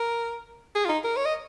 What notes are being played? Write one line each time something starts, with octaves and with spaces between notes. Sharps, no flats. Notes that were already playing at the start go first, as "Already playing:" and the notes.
Already playing: A#4
G#4
F4
D#4
A#4
C#5
D#5